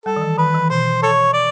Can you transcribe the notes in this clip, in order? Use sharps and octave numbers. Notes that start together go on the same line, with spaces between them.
G3 A4
D#3
E3
D#3 B4
E3
B2 C5
A4 C#5
D5